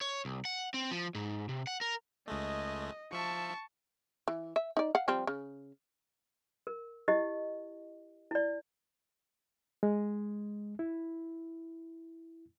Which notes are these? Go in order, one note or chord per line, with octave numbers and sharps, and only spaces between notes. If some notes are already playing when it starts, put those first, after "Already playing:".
C#5
C2
F#5
C4
F3
G#2
C3
F#5
A#4
C#2 G#3 A3 D#5
F3 E5 A5 C#6
E3
E5
D#4 D5
F5 F#5
F3 G3 C4
C#3
A#4
E4 G4 D#5
E4 D5
G#3
E4